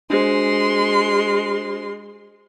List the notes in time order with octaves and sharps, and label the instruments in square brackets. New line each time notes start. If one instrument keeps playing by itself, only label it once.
[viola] G#3 C6 [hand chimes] D4 F#4 C5